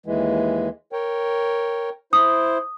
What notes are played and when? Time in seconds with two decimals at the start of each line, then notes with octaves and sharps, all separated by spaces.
0.06 D#2 E3 G#3
0.92 A#4 C#5 G5
2.13 E4 C5 D#6